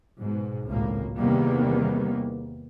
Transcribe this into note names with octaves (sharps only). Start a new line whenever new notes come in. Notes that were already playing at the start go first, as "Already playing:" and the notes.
G#2 B2
G#1 C#2 A2 A#3
E2 C3 D#3 G3 A#3 B3